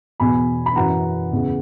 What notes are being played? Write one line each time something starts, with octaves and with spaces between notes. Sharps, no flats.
E2 B2 G#5 B5
B5
F#2 E3 F#5 A#5
E2 C#3 E3